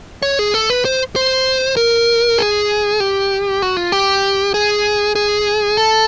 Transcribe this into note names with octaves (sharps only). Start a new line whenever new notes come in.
C#5
G#4
A4
B4
C5
C5
A#4
G#4
G4
F#4
F4
G4
G#4
G#4
A4